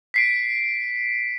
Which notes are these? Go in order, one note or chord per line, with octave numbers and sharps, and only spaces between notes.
B6 C7 D7